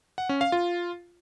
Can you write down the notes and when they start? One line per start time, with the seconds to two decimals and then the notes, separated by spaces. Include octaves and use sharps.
0.18 F#5
0.29 C#4
0.41 F5
0.52 F4